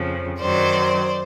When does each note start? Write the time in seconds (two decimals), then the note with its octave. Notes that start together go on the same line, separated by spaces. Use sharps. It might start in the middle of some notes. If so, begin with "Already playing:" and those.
Already playing: F2 C#3 F3
0.41 F#2 D#3 F#3 C5 D5